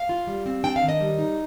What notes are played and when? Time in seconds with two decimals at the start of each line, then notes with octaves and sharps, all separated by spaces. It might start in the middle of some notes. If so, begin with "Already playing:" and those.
Already playing: F5
0.09 F4
0.27 G3
0.46 C4
0.64 D4 G5
0.76 F5
0.83 D#3
0.89 D#5
1.00 G3
1.18 D#4